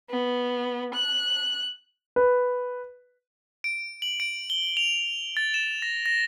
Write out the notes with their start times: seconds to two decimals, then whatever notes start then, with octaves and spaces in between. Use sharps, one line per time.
0.10 B3
0.95 F#6
2.16 B4
3.64 D7
4.02 F#7
4.20 D7
4.50 G7
4.77 F7
5.37 A6
5.54 E7
5.82 A#6
6.06 A#6